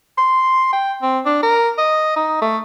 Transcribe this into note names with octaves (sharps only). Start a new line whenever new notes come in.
C6
G5
C4
D4
A#4
D#5
D#4
A3